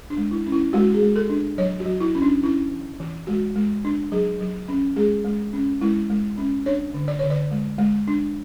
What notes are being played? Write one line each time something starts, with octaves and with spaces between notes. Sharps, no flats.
D4
G#3
E4
C#4
E4
G#3 F#4
G#4
G#3
A4
D4
F#3 C#5
F#4
F#3
E4
C#4
D4
C#4 E4
E3
E3
G#3 F#4
G#3
D4
F#3 G#4
F#3
C#4
G#3 G#4
G#3
C#4
G#3 E4
G#3
C#4
D4 C#5
D3
D5
D3 C#5
D5
G#3
G#3
D4